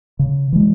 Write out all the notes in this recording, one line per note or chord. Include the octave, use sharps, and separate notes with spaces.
C#3
E3 G#3